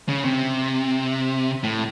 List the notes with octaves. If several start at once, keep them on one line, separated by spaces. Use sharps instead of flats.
C#3
C3
A2